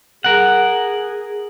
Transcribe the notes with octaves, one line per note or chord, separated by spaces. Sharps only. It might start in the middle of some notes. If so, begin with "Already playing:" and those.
G#4 A#4 F#5